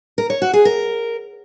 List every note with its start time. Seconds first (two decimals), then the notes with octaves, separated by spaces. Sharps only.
0.18 A#4
0.30 C#5
0.42 F#4
0.53 G#4
0.65 A#4